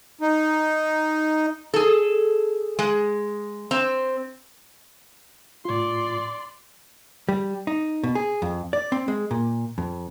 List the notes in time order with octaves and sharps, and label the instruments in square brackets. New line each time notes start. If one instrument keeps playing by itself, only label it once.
[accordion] D#4
[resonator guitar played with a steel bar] G#4 A4
G#3
C4
[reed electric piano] A2 F4 [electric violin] D5 C6
[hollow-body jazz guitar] G3
D#4
B2
G#4
F2
D5
C4
G#3
A#2
F2